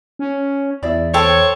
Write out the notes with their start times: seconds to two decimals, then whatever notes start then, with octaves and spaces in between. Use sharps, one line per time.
0.19 C#4
0.83 E2 E4 G#4 D5
1.14 A4 C5 C#5 G5